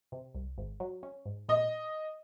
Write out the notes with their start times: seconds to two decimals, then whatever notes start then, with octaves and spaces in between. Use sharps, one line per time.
0.12 C3
0.35 C2
0.58 G#1
0.80 F#3
1.03 C#4
1.26 G#2
1.49 A#2 D#5